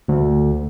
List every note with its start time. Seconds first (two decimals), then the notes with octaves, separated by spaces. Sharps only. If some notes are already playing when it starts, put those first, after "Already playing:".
0.08 D2